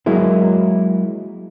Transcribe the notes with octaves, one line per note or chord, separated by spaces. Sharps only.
F#3 G#3 A#3 E4